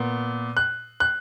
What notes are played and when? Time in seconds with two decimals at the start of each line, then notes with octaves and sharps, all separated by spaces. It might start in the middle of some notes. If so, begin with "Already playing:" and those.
Already playing: A#2 B3
0.57 F#6
1.00 F#6